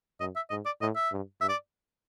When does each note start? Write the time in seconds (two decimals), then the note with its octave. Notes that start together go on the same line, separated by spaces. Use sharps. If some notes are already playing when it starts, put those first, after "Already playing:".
0.20 F#2 D#5
0.36 E5
0.50 G#2 D#5
0.65 D5
0.81 A2 D#5
0.96 E5
1.12 G2
1.41 G2 E5
1.49 D5